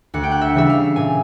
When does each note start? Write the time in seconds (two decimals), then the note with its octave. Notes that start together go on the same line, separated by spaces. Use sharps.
0.14 D2 F#5
0.23 G5
0.31 F#5
0.41 E5
0.55 C#3 E3 G3 E5
0.69 F5
0.96 A#2 G#5